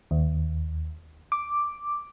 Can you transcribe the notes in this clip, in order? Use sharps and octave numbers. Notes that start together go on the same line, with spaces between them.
D#2
D6